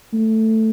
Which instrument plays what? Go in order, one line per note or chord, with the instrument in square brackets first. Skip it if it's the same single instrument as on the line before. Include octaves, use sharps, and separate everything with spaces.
[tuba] A3